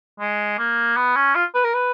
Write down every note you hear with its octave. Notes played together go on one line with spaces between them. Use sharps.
G#3
A#3
B3
C#4
F4
B4
A#4
B4